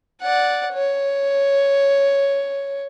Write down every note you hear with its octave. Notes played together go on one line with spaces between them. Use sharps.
D5 F#5
C#5